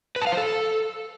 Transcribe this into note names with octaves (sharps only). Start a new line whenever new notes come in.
B4
A5
F5
C5
A4